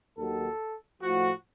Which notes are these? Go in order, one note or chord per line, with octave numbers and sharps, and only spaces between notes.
D#2 D#3 F#3 A4
A2 F3 F#4